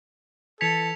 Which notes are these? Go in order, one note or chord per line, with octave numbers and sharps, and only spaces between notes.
E3 A4 A5 G#6 B6 C#7 F7